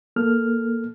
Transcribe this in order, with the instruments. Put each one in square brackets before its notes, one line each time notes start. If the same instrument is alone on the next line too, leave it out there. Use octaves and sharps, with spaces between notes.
[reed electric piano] A#3 A4 F6